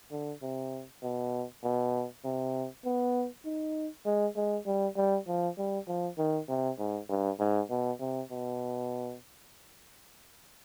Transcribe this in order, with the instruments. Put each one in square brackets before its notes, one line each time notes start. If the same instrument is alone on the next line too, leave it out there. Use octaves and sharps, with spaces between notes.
[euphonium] D3
C3
B2
B2
C3
B3
D#4
G#3
G#3
G3
G3
F3
G3
F3
D#3
C3
G#2
G2
G#2
B2
C3
B2